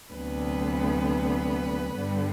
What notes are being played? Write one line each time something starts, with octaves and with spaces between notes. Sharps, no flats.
D2 C3 F#3 B3 B4
G2 D3 G3 B3